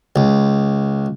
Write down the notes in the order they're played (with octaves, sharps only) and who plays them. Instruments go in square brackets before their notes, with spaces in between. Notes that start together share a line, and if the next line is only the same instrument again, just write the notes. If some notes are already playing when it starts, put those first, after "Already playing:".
[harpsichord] C#2